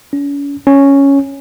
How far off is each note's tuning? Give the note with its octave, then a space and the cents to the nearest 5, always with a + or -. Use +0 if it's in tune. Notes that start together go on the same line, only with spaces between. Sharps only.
C#4 +40
C#4 +0